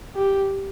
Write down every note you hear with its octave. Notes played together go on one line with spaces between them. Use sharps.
G4